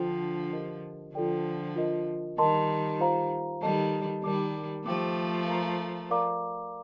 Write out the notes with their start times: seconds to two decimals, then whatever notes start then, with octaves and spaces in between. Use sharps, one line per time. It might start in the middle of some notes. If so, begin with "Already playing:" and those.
Already playing: D3 F3 D4 F4 A4 C5 G5
0.53 G4 A#4 D#5
1.14 D3 F3 F4 A4 D5 G5
1.76 F4 A#4 D#5
2.38 D#3 G3 A#4 D#5 A5 C6
3.00 F4 C5 F5 A#5
3.62 D#3 G3 A4 D#5 A5
4.24 D#3 G3 A#4 D5 A5 D6
4.86 F3 A3 G4 C5 G5 D6
5.48 A#4 F5 A#5
6.11 A#4 D5 F5 A#5 D6